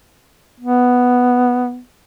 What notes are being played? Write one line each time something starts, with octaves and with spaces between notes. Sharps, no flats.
B3